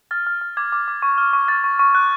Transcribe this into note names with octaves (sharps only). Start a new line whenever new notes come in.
F6 A6
F6
F6
D6 G#6
D6
D6
C#6
F6
C#6
F6 A6
C#6
C#6
F#6